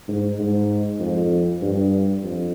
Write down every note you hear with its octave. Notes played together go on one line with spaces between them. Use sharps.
G#2
G#2
F2
G2
F2